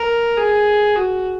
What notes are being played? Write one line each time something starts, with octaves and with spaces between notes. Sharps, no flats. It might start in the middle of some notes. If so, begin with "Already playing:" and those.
Already playing: A#4
G#4
F#4